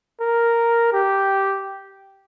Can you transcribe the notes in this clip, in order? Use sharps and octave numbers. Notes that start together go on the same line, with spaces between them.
A#4
G4